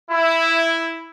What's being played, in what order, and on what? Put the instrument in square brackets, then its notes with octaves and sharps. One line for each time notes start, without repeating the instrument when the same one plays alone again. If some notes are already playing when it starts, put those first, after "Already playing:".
[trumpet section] E4